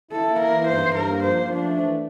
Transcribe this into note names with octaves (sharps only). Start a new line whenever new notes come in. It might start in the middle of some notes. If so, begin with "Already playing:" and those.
E4 A4
A#3
A#4
E3
G2 C5
G2
A#4
A#3
F3 C5
F3
D4
A3
E3